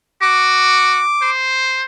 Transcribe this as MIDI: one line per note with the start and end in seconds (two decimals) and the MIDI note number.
0.21 1.02 66
0.21 1.30 86
1.22 1.85 72